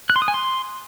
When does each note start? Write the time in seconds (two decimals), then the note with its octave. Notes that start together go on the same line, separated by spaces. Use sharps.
0.10 F#6
0.16 C6
0.22 D#6
0.28 G#5
0.34 C6